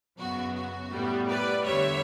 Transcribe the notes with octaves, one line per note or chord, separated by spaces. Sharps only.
F#2 C#3 F#3 B3 F#4
F#4
A2 G3 B3
B4 D5
E2 D3 G3 C#5 E5